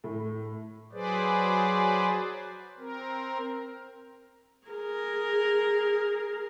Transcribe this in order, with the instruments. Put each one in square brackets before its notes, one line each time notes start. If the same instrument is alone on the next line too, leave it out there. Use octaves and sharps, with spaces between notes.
[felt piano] A2
[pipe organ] F#3 G#4 B4 C5 D5
C4 A#4
[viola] G#4 A#4